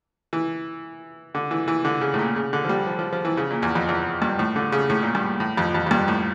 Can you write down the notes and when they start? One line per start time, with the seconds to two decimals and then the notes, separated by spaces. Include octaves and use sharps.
0.33 E3
1.35 D3
1.51 E3
1.68 E3
1.85 D3
2.01 C#3
2.14 A2
2.19 A#2
2.36 C#3
2.53 D3
2.65 F3
2.69 G3
2.87 F3
2.99 F3
3.13 F3
3.25 E3
3.37 C#3
3.51 A#2
3.62 E2
3.75 F2
3.88 E2
4.22 G2
4.39 A2
4.56 D3
4.72 C#3
4.90 A2
5.03 A#2
5.15 G2
5.40 A2
5.57 F2
5.74 F2
5.86 F2
5.91 G2
6.08 A2